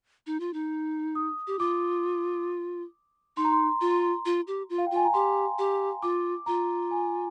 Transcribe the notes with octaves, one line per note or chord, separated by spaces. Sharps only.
D#4
F4
D#4
D#6
G4
F4 D6
D#4 C6
A#5
C6
F4
F4
G4
F4
F5
G5
F4 G#5
A#5
G4 C6
G4
F4 D6
F4 A#5
G#5